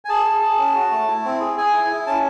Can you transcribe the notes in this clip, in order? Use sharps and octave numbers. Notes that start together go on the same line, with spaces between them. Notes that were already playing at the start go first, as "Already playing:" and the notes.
G#5
G#4 A5
G#4
G#4
C#4
F#4
A3
E4
C4
G#4
G#4 G#5
E4
E4
C#4 A5